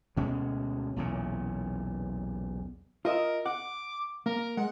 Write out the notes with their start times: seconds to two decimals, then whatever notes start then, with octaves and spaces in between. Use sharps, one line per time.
0.16 D2 B2 G#3 C#4
0.96 B1 E2 A#2 C#3
3.05 F4 A#4 D#5 E5
3.46 F#5 D6
4.26 A#3 A#4
4.57 G#3 F#5